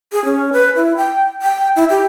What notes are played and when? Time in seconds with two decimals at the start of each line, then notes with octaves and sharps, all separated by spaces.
0.12 G#4
0.25 C#4
0.53 B4
0.76 E4
0.97 G5
1.42 G5
1.76 E4
1.90 G4